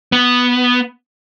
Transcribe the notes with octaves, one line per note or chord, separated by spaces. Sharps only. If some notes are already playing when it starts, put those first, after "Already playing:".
B3